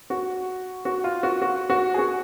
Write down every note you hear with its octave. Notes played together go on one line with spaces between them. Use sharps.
F#4
F#4
F4
F#4
F#4
F#4
G#4
F#4